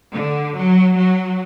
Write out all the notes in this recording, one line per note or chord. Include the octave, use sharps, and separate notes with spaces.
D3
F#3
F#3